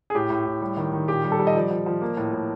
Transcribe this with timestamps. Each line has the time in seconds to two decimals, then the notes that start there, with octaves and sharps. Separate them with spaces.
0.10 G#4
0.15 A2 G4
0.30 A2
0.46 A2
0.61 G3
0.77 D#3
0.92 D#3
1.08 A#2 G4
1.24 G3
1.32 A4
1.39 G3
1.47 D#5
1.55 F3 D5
1.71 F3
1.86 F3
2.02 A#3
2.17 A2
2.33 A2